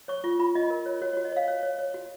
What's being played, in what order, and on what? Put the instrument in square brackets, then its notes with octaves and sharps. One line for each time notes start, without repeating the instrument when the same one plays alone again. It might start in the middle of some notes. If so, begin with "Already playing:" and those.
[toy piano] C#5 C#6
F4 C#6
F4 B5
F4 D#5
A#4
C#5
F#4 C#5
C#5
F#4
D#5
C#5 F5
C#5
C#5
C#5
F#4